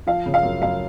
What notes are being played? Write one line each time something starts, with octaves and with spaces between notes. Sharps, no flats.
F3 F5
C#3
F5
F#2
F#2 F5